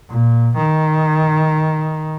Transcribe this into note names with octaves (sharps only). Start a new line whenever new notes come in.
A#2
D#3